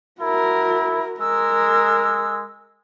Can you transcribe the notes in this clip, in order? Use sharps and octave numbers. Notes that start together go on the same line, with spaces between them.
E4 F#4 A#4
G#3 A#4 E6